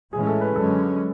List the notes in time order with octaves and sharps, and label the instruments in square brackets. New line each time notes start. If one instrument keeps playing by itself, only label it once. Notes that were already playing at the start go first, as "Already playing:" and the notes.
[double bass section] A2 E3 G#3 C#4 [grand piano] G#4
[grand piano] G#4
A4
B4
[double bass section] F#2 D3 G#3 C#4 [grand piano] A4